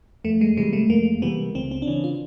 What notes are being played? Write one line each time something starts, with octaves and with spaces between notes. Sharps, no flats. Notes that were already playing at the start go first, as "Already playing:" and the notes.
F2 A3
G#3
C3 E3 G3 G#3
A3
F2 A#3
C3 E3 G3 B3
C#2 C4
C4
D4
C#3 E3 C#4
F4